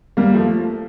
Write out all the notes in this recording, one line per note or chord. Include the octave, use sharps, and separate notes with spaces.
G3 A#3
F3 A3